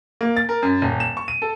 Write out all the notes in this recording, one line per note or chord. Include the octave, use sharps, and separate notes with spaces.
A#3
A6
A#4
F#2
D#1
E7
C#6
D#7
A4